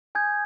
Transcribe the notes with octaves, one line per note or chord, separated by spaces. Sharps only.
G#5 D#6 G6 G#6